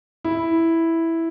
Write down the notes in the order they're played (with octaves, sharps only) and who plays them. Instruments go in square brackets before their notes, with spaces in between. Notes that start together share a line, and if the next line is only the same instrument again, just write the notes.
[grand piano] E4